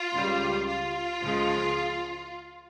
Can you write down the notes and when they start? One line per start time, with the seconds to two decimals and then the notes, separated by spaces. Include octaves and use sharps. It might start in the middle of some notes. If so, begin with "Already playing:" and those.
Already playing: F4
0.15 C#2 C#3 G3
0.68 F4
1.21 C#2 C#3 F3 G#3